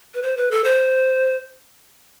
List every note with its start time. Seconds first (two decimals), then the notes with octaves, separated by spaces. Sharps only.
0.14 B4
0.22 C5
0.37 B4
0.51 A4
0.64 C5